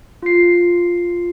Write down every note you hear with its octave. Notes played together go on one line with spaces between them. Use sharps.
F4 C7